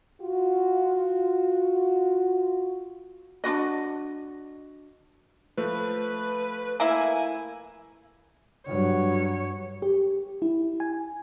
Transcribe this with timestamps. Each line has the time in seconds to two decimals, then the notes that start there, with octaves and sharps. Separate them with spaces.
0.21 F4 F#4
3.44 D4 F4 F#4 D#5
5.57 F3 A3 B4
6.80 A#3 E4 G#5
8.66 G2 F#3 C#5
9.82 G4
10.42 E4
10.80 G#5